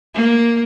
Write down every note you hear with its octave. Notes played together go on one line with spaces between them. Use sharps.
A#3